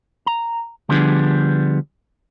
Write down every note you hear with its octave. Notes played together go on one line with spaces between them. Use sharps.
A#5
D3 F3 G3 B3 D4 G#4